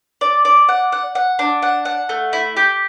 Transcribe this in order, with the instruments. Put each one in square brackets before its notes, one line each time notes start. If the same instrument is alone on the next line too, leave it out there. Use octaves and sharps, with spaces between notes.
[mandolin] D5
D5
F#5
F#5
F#5
D4
F#5
F#5
A3
E4
G4